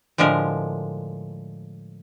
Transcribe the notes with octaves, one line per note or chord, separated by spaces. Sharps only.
A2 D3 F3 G#3 A#4